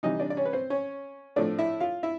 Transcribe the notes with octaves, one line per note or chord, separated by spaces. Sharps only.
C3 E3 G3 D#4 D#5
D4 D5
D5
C#4 C#5
B4
C4 C5
C#4 C#5
A2 F3 A3 D4 D5
E4 E5
F4 F5
E4 E5